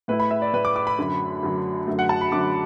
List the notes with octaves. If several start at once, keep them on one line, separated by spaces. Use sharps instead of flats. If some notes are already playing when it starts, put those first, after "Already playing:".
A2 A3 E4 B4
B5
E5
D5
A2 A3 E4 B4
D6
D6
B5
F#2 D3 F#3
F#2 D3 F#3
F#2 D3 F#3 A3
F#5
A5
B5
F#2 D3 F#3 A3 D6